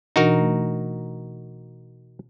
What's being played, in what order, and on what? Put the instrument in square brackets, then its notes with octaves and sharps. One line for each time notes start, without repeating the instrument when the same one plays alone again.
[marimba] B2 E3 D4 [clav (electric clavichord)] D#4 F#4 A#4
[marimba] A3